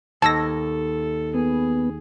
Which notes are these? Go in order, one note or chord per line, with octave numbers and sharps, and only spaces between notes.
D#2 A4 A5 E6 A#6
B3 G#4